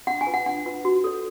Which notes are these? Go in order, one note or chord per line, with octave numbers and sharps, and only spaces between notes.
D4 F#5
G#5
F4 B4
F#5
D4 F#5
F4 B4
F#4
A4 C#5